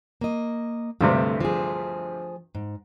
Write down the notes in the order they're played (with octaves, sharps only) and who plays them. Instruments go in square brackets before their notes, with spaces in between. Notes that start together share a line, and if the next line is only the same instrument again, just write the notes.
[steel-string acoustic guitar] A#3 D#5
[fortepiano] D2 G2 C3 [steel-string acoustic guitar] A3
[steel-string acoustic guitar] F3 G#4
G#2